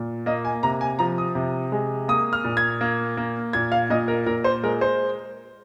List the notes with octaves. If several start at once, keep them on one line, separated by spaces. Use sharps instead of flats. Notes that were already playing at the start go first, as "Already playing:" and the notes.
Already playing: A#2
A#3 D#5
G#5
C3 A#5
G#5
F3 A#5
D#6
C3
G#3
A#3 D#6
F6
A#2
G#6
A#3
A#3
A#2 G#6
F5
A#2 D#5
A#4
A#2 A#4
C5
G#3 A#4
C5